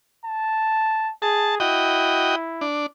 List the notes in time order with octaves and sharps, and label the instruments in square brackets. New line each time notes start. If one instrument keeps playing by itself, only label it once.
[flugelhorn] A5
[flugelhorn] G#4 [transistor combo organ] A5
[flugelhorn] E4 [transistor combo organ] F#4 D#5 G5
[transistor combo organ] D4